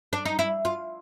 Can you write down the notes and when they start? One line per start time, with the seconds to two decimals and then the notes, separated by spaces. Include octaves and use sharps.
0.13 D4
0.25 D#4
0.39 E4
0.65 F4